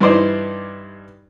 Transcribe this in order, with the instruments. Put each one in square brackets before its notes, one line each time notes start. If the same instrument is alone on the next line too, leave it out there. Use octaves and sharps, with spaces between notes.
[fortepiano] G2 E3 D#4 C5 D5